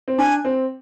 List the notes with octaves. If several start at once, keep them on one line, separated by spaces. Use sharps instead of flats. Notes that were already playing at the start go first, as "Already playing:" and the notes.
C4
D4 G#5
C4